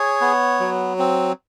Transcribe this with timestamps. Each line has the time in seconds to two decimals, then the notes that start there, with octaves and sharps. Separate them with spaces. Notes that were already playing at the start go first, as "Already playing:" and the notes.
Already playing: G#4 C#5
0.21 B3
0.60 F#3
0.99 C4